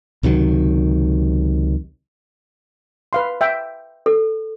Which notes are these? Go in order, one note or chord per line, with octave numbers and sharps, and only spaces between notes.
C#2 C3 D#3 F#3
B4 F5 C6
E5 G5
A4